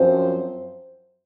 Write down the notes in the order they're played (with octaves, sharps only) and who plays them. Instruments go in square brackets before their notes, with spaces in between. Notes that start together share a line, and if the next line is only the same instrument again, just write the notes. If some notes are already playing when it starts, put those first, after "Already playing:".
Already playing: [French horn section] F#2 F3 C4 C5